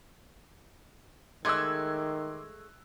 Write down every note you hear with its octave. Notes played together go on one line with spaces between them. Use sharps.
D#3 G#3 A3 C6 D6 E6 F#6 G#6